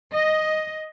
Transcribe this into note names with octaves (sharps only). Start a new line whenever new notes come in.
D#5